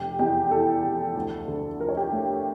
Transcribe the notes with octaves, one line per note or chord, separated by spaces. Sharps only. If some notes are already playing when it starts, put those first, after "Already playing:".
Already playing: F1 G4
E2 G4
E3 A4
F1
D2
D3
F3 A#4
C#5
G4 A#4
A3